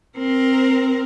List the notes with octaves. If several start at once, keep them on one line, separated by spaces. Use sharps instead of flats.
C4 A#4